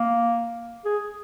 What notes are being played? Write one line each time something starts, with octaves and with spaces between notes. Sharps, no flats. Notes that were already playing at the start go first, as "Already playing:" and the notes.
Already playing: A#3
G#4